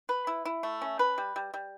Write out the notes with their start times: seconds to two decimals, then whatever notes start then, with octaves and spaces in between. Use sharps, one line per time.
0.09 B4
0.27 E4
0.45 E4
0.63 A3
0.82 C#4
0.99 B4
1.18 G3
1.36 G3
1.54 G3